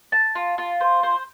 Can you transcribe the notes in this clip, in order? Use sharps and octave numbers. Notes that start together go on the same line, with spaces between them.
A5
F4
F4
C5
C5